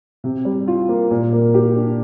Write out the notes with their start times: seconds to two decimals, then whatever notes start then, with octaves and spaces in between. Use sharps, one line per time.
0.24 C3
0.45 G3
0.68 F4
0.89 A#3
1.11 A#2
1.33 A#3
1.54 G4
1.76 D4